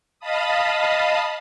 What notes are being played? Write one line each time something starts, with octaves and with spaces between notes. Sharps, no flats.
D#5 F5 A5 B5 D#6